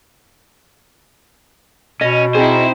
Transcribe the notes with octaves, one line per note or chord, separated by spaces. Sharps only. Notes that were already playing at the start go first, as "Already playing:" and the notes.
B2 C#4 D#5
C4 D#4 E4 G#4 C5